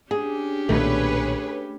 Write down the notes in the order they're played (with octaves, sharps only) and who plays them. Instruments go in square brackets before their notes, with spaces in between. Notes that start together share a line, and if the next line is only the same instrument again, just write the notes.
[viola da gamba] C#4 D4 G4 [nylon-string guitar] G#4
[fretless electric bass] B1 A#2 D#3 [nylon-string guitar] A3 [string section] G#4 B4 C#5